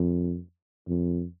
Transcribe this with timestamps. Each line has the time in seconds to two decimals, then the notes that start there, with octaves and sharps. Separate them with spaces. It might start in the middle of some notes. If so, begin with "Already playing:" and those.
Already playing: F2
0.88 F2